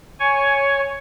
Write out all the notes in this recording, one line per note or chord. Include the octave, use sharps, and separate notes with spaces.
C#5 G#5 C#6